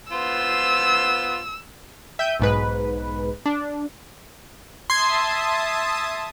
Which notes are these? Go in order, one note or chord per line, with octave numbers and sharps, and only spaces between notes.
B3 F4 C5 E6
E5 G5 G6 D#7
B1 G#2 B4
D4
E5 A5 C6 D#6 G#6